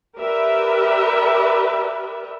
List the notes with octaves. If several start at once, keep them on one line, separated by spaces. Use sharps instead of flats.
G4 A#4 B4 D5 E5